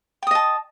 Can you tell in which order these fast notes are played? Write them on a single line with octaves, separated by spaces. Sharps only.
G5 D#6 D#5 A5